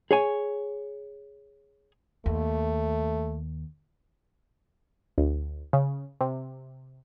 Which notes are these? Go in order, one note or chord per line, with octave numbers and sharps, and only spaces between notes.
G#4 C#5 G#5
D#2 A3
D2
C#3
C3